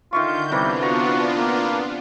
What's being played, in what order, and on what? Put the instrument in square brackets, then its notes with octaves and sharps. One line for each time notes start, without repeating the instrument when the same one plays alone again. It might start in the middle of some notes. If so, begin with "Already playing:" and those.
[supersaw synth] D3 G6 [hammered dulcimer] D#3 E5 C#6 [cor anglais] F4
[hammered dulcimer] C3 E3 [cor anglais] G3 [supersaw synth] B3 D4 F4
[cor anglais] F#4 [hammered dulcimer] A#5
[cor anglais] A#3